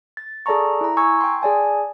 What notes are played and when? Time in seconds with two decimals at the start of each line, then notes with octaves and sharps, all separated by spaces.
0.17 A6
0.46 G#4 A4 D5 A5 A#5 C#6
0.81 E4 A#5
0.97 G#5 A#5 C#6 E6 G#6
1.21 G5 C6
1.41 G#4 D5 G#5 A5